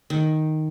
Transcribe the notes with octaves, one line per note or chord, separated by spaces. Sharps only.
D#3